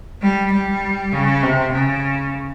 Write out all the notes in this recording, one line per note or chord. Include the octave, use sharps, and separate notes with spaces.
G3
G3
C#3
C3
C#3